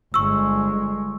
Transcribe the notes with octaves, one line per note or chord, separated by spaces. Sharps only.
G1 G#3 C#6 E6